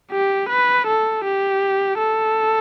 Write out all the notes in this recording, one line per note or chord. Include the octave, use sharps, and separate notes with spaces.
G4
B4
A4
G4
A4